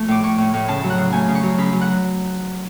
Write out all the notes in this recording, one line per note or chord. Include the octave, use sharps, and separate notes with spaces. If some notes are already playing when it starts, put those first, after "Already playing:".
Already playing: F3 A3
A2 D6
A2 C#6
A2
A2
C#3 A5
F#3
F#5
C#3
A3 G#5
C#3
C#6
F#3
C#3 B5
F#3
F#5